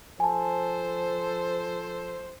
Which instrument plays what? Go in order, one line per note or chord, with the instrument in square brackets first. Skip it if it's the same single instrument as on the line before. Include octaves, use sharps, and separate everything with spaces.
[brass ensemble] F3 A4 C5 [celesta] G#5 A5